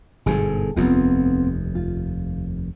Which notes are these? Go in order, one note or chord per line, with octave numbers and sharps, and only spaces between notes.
G1 G#2 B2 G#4 A4
F1 D#2 B3 C4 F4
F4